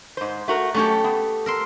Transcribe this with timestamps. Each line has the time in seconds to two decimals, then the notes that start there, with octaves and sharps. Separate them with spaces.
0.17 G#2 C5
0.48 A3 F#4 A#4
0.74 F#3 A3 C#4 G4 A5
1.04 B3
1.46 A#4 E5 C6